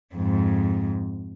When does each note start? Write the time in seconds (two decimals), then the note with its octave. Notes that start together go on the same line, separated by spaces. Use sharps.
0.15 F2 G#2